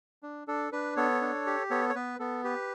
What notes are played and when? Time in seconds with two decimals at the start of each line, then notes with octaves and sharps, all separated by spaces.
0.23 D4
0.47 D4 A4
0.72 D4 B4
0.96 B3 A4 C#5
1.21 D4
1.46 G4
1.70 B3 A4 C#5
1.89 C#5
1.95 B3 B4
2.19 B3 A4
2.44 G4 B4